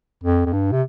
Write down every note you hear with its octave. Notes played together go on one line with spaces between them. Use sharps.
F2
F2
G2
C3